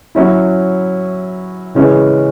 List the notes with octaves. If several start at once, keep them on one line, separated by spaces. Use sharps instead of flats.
F#3 C#4 E4
C#3 E3 G#3 C#4